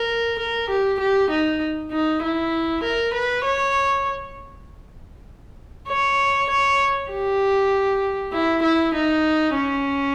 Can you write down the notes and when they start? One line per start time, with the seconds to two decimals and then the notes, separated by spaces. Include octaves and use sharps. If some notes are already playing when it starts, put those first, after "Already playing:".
Already playing: A#4
0.39 A#4
0.69 G4
1.00 G4
1.30 D#4
1.91 D#4
2.23 E4
2.83 A#4
3.13 B4
3.44 C#5
5.88 C#5
6.50 C#5
7.11 G4
8.32 E4
8.63 E4
8.94 D#4
9.54 C#4